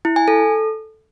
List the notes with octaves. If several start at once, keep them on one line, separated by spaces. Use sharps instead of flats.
E4
G#5
A4